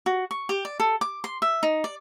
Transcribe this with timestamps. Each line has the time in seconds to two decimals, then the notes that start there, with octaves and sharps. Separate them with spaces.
0.06 F#4
0.31 C#6
0.49 G4
0.65 D5
0.80 A4
1.01 D6
1.24 C6
1.42 E5
1.63 D#4
1.84 D5